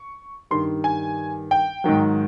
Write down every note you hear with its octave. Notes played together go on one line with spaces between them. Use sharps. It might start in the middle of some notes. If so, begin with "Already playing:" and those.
Already playing: C#6
G2 D#3 G3 C6
G#5
G5
G#2 D#3 F#3